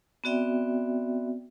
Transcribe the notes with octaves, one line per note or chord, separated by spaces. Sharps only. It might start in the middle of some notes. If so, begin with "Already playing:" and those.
B3 C4 F#4 D5 E5 G5